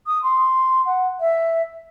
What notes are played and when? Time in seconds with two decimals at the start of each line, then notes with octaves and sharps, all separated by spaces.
0.06 D#6
0.23 C6
0.85 F#5
1.20 E5